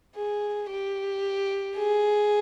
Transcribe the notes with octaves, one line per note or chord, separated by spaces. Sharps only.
G#4
G4
G#4